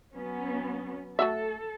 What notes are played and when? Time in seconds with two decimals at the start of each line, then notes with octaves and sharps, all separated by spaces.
0.13 F#3 B3 C#4
1.19 A3 F#4 A4 E5